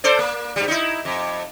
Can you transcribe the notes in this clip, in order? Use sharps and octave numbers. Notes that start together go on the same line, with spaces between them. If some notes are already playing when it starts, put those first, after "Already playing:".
A4 C5 D5
A#3
G2 G3
D#4 E4
F2